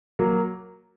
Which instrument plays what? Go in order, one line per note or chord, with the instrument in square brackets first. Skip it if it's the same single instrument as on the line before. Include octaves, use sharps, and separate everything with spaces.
[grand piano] F#3 A#3